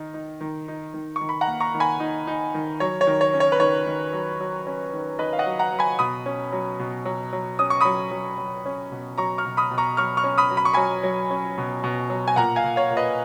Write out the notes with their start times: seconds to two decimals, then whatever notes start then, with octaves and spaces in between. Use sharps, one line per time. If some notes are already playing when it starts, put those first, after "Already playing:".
Already playing: D#3 D#4
0.14 D#4
0.41 D#3
0.68 D#4
0.94 D#3
1.16 D#3 C#6
1.29 B5
1.41 F#5 A#5
1.47 A#3
1.60 A#5 C#6
1.74 D#3
1.80 G#5 B5
2.00 D#4
2.27 D#4
2.54 D#3
2.80 F#3 C#5
3.01 C#5
3.07 D#3
3.21 C#5
3.34 C#4
3.40 C#5
3.52 B4
3.60 D#3 C#5
3.86 D#3
4.13 F#3
4.40 F#3
4.67 C#4
4.93 D#3
5.19 D#3 B4 D#5
5.33 F5
5.39 D#5 F#5
5.46 F#3
5.59 F#5 A#5
5.72 F#3
5.79 G#5 B5
5.99 B2 B5 D#6
6.26 C#4
6.53 F#3
6.79 B2
7.05 F#3
7.33 F#3
7.59 C#4 D#6
7.70 C#6
7.81 F#3 B5 D#6
8.11 F#3
8.38 F#3
8.65 C#4
8.92 B2
9.18 F#3 A#5 C#6
9.38 C#6 F6
9.45 B2
9.57 B5 D#6
9.71 B2
9.78 A#5 C#6
9.97 F#3 C#6 F6
10.17 C#6 F6
10.24 C#4
10.38 B5 D#6
10.50 F#3
10.57 B5
10.65 C#6
10.73 F#3 G#5 B5
11.03 F#3
11.30 C#4
11.58 B2
11.84 B2
12.10 F#3
12.28 G#5
12.36 A#2 F#5 A#5
12.56 F5 G#5
12.64 A#2
12.76 C#5 F5
12.90 A#2
12.97 B4 D#5